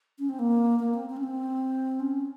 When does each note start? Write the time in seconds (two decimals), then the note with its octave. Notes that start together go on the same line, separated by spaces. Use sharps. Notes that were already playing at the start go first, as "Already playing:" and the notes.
0.19 C#4
0.29 C4
0.39 A#3
0.80 A#3
0.94 C4
1.10 C4
1.17 C#4
1.23 C4
2.00 C#4